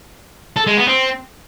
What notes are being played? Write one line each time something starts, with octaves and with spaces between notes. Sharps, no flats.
A4
G#3
B3
C4